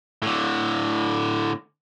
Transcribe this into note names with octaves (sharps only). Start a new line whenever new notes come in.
A2 D3